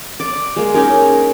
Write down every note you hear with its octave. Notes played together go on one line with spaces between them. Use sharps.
D5 D6
G#3 A#3
C#4 D#4 G#4 A#4